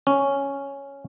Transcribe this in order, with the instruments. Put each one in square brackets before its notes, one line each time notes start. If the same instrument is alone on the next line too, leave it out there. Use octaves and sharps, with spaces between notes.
[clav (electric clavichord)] C#4